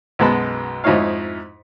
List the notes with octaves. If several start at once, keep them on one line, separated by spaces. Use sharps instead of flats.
B1 F#2 G#3 B3 A5 B5
F2 G#2 D#4 E4 C#5 F5